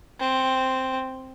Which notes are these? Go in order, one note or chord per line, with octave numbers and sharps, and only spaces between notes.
C4